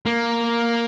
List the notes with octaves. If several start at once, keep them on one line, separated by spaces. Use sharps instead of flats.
A#3